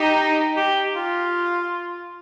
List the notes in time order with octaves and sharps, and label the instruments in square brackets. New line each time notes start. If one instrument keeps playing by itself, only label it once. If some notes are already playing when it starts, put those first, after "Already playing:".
Already playing: [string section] D#4 [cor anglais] G4
[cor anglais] G4
F4